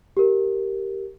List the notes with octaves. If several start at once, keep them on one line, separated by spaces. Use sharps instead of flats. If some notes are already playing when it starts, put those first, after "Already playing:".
G4 A#4